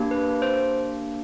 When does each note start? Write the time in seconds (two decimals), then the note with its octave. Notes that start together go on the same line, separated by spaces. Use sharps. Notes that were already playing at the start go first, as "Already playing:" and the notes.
Already playing: A#3 D4 G4
0.11 B4
0.42 C5